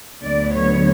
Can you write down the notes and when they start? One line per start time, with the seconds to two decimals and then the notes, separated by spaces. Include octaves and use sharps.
0.22 D2 D3 F#3 B3 D5
0.53 C#5